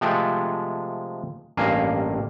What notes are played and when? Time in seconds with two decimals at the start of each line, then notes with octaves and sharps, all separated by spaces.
0.01 C3 F3 G#3 A3 G5
1.57 A1 G2 A#3 F5 G#5 A#5